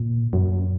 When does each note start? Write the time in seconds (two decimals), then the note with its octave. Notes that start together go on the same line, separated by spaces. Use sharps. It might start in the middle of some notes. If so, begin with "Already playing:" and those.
Already playing: A#2
0.33 F#2